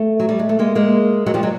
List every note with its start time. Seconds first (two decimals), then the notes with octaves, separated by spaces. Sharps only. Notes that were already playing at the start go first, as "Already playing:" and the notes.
Already playing: A3
0.20 F#3
0.29 G3
0.39 G#3
0.49 A3
0.59 G#3 A#3
0.75 G#3 A#3
1.26 F#3 G#3
1.34 F3 G3
1.43 F#3 G#3